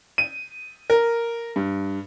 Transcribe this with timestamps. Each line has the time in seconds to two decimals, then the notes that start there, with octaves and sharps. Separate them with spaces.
0.18 D#7
0.90 A#4
1.56 G2